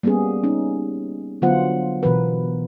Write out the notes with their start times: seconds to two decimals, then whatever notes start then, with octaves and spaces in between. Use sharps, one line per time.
0.03 G3 A#3 B3 C#4 G#4
0.44 C#4 D#4
1.42 D3 F#3 B3 F4 C5 F#5
2.03 B2 E3 A#4 B4